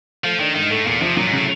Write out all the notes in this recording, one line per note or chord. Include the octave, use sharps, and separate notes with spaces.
F3 A3
D#3 D4
G#2 D#3
A2 A3
E2 A#2
C3 F3
A#2 F#3
G#2
C#3
A2